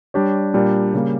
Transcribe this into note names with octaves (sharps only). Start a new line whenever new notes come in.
G3 D4 G4 C#5
A#2 G3 D4 G4 A#4
C#3 G3 A#3